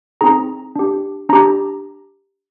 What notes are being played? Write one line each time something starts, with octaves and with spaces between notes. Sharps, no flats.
C4 D#4 G#4 A#5
D4 G4
D4 G4 A#5